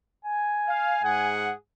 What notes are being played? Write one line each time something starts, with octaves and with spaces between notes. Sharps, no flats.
G#5
F5
G#2 G#4 F#5